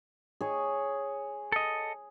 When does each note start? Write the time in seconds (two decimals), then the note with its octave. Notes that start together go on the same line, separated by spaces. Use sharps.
0.41 G#4 C#5
1.52 A4 D#5